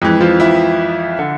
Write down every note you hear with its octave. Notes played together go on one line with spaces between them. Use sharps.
F2 E3 G#3
F3 F4
E3 E4
D3